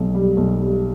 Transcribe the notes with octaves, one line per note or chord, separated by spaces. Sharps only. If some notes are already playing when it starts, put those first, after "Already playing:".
Already playing: B1
G3
B1
G3